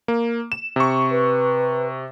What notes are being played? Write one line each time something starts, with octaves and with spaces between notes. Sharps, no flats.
A#3
E7
C3 C#6
B4